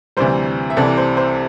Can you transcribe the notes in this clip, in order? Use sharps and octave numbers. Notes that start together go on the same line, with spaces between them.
D2 C3 E3 G3 C5
E5
C2 C3 E3 A4 D5
C5
C5